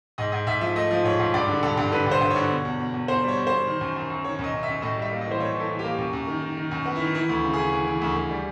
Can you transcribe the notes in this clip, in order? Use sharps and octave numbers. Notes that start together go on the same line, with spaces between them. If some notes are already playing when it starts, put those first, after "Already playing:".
G#2 D#5
G#2 D#5
G#2 E5
F3 E5
A3 D#5
F3
G#2 C#5
G#2
G2 D5
D3
G2 A4
G2
D3 B4
G2 C5
G2
C#5
D3
B2
E2
B2
E2
E2 C5
G3 C#5
E2
C5
B2
D#3
F#2
F#2
F#2
D#3 C#5
F#2 D#5
F#2
E5
F#2
A2 D#5
G3 E5
A#3
D#5
E3
C5
A2 C#5
E3 A4
E3
G4
A#3
F#2
F#2
D#3
D#3
D#3
F#2
B3
D#3 E4
E3 E4
D2
C#3
E3 G#4
E3
E3
D2
D2
G3